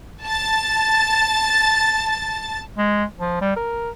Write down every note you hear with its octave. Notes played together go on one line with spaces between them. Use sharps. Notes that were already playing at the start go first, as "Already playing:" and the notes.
A5 A6
G#3
F3
G3
A#4